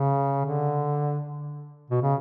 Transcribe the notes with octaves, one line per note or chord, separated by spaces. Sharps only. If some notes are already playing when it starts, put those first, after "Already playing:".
Already playing: C#3
D3
B2
C#3